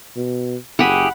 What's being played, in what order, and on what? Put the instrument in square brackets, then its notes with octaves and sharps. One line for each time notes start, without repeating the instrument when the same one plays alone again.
[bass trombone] B2
[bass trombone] F#1 [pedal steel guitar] E4 G4 G#4 [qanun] F#5 B5